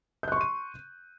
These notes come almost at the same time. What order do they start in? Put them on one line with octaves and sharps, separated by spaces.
G6 F#6 C#6 C6 D#7